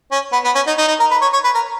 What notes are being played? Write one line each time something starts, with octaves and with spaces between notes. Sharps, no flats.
C#4
B3
B3
C#4
D#4
D#4
D#4
A#4
B4
C#5
C#5
B4
A#4